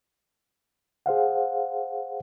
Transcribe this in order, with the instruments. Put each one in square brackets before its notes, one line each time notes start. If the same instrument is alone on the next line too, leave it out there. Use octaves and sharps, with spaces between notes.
[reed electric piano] G#4 C5 F5 F#5